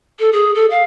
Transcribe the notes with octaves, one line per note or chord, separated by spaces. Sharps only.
A4
G#4
A4
F5